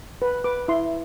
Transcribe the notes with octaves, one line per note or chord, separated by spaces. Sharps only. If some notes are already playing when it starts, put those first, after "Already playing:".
B4
B4 D6
E4 C6